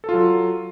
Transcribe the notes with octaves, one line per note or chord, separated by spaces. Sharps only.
F#3 F4 A4